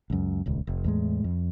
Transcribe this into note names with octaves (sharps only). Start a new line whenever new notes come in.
C#2 F#2
D#1 C#2
F1
E2 A2 G#3
F2